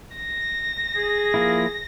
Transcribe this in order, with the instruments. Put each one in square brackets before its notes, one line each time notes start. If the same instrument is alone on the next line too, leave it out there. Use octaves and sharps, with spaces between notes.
[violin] A#6
[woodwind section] G#4
[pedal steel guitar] F3 A#3 E4